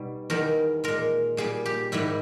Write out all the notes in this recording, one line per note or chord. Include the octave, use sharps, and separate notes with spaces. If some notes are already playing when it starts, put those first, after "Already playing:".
Already playing: B2 G3 D#4
E2 D#3 G3 A#4
A#2 G#3 A#4
A#2 G3 G#4
G4
G#2 D#3 G3 E4